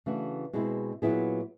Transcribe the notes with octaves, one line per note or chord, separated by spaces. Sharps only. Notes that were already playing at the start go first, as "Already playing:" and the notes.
C#3 E3 A3 D4 F#4
B2 G#3 C4 E4
A#2 F#3 B3 E4 G#4